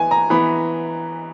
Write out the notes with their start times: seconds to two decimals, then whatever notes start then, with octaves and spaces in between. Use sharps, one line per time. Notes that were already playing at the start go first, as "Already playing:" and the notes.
Already playing: E3 B3 G#5
0.11 A#5
0.30 E3 B3 B5